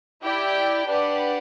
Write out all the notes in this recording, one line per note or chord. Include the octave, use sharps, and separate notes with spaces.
E4 G4 D5 G5
D4 G4 B4 D5 F#5